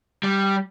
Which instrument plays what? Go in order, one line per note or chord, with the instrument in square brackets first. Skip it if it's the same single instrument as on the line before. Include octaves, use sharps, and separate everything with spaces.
[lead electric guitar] G3